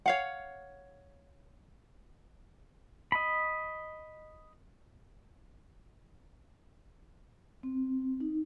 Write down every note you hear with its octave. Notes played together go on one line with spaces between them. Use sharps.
C#5 F5 F#5
D#5 B5
C4
D#4